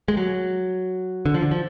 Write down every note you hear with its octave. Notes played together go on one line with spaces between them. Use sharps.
G#3
F#3
D3
F3
D3
F3